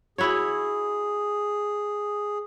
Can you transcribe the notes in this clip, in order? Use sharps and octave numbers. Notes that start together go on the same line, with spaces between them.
E4 F#4 G#4 C#5